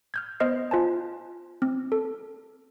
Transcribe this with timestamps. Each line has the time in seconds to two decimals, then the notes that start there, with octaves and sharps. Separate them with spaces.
0.14 F6 G6 G#6
0.40 B3 C5 D#5 F6 C7
0.71 F4 C5 G#5 A5
1.62 C4
1.92 A4